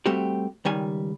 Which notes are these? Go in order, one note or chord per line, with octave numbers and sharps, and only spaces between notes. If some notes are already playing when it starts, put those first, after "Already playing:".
G3 A3 C4 F#4 G4
C#2 D#3 G3 G#5